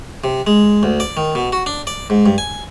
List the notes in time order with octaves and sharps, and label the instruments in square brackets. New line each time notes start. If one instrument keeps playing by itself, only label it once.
[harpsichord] C3
G#3
D2
D5
D#3
B2
F#4
D4
D5
G#2
G2
G#5